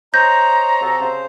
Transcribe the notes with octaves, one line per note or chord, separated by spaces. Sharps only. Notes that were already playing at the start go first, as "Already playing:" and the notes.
C5 C#5 D#5 A#5 G6 A#6
C3 F#4 A4
C#3 C5